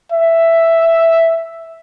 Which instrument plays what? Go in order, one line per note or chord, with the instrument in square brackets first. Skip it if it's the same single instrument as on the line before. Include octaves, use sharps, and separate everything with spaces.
[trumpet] E5